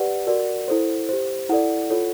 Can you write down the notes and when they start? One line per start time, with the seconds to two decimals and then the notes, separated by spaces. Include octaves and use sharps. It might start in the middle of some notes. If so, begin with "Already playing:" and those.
Already playing: G4 B4 D5 F#5
0.27 F#4 A#4 D5
0.68 E4 A4 C5
1.09 G4 C5
1.49 E4 A4 D5 F#5
1.90 F4 A4 C#5